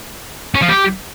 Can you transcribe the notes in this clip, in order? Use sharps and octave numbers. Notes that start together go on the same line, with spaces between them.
C#4
F3
G4